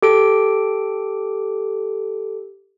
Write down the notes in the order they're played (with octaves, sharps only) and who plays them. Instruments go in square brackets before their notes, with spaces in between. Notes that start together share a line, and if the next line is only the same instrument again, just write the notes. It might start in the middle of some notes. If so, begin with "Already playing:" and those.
[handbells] G4 A4 D7